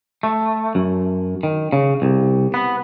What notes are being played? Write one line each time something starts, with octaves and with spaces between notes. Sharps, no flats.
A3
F#2
D#3
C#3
C2
B3